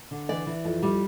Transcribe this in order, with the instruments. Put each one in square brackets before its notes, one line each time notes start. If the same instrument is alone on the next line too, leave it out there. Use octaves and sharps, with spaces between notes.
[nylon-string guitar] D3
E3 D5
E3
F2
G3